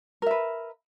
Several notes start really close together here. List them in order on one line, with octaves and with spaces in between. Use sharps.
A#4 E5 B4